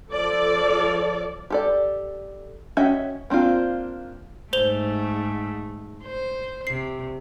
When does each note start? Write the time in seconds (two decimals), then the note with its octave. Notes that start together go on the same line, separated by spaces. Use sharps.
0.10 F3 A4 D5
1.50 G4 A4 D5
2.77 C#4 F#4 D#5 E5 G5
3.30 A#3 C4 D4 F4
4.53 G#2 A3 C5 F7 G7
6.04 C5
6.67 C3 C7